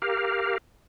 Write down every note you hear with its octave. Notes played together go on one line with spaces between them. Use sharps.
G4 A#4 F5